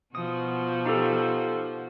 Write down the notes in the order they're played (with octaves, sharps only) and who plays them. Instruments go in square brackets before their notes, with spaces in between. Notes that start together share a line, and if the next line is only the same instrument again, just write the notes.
[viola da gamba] B2 F3 F#4 [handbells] D#6
[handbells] D#4 G4 A4